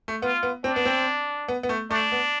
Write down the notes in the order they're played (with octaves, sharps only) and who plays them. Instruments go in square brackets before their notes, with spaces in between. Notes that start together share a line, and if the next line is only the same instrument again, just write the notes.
[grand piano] A3
[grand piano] B3 [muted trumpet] F4
[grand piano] B3
[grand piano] C4 [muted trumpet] D4
[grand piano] B3
C4
B3
B3
A3
[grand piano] A3 [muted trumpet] D4
[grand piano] B3